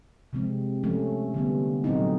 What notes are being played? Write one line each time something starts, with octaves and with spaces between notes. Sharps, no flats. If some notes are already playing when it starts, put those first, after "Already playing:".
C3 F3 G#3 C4
F3 A3 C#4
D3 G3 B3
A#2 F#3 A3 C4 D#4